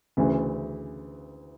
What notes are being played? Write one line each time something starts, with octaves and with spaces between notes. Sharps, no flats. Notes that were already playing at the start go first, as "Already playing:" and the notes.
D2 C#3 E3